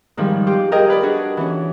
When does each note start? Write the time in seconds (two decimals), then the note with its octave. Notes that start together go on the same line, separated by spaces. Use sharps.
0.17 G#2 D#3 F3 G3
0.47 F4 G4 D6
0.72 G4 G#4 A#4 D#5 G5
0.90 B4 D5
1.03 D4 F#4 G#4
1.37 E3 C#4